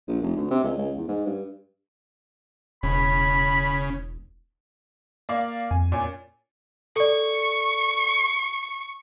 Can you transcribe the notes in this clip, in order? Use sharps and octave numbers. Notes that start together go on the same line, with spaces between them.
A#1
F1
D2
C3
C#2
C#2
E2
G#2
G2
E1 C#3 B5
A#3 D5 F5
F2 G#5
A#2 C#4 G#5
A4 D5 C#6